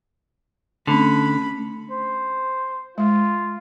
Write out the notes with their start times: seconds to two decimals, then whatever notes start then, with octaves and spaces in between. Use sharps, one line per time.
0.87 D3 A3 C4 C#4 B5
1.91 C5
2.98 G#3 F4